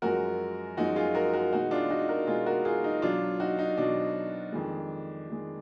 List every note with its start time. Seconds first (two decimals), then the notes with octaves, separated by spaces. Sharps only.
0.02 F#2 F3 G#3 F#4 A#4
0.77 F#2 F3 G#3 D#4 F#4
0.96 F4 G#4
1.15 F#4 A#4
1.33 F#4 A#4
1.53 B2 G#3 D#4 F#4
1.71 D4 F4
1.90 D#4 F#4
2.08 F#4 A#4
2.27 B2 G#3 F4 G#4
2.46 F#4 A#4
2.65 F4 G#4
2.84 D#4
3.02 B2 F#3 D4 F4
3.40 D#4 F#4
3.59 D#4
3.78 B2 F#3 D4
4.52 F2 D#3 G#3
5.28 F2 D#3 G#3